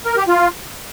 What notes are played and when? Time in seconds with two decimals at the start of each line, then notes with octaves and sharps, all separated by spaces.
0.05 A#4
0.17 G4
0.28 F4